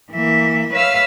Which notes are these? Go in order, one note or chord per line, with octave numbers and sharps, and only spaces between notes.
E3 A#3 E5
B4 C#5 E5 F5 E6 F6